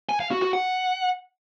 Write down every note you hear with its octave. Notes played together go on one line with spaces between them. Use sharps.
G#5
F5
F#4
F#4
F#5